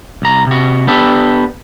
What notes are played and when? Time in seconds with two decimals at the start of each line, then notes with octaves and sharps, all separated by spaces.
0.22 C2 A#5
0.47 C3 F#4
0.87 B3 D4 G4 A4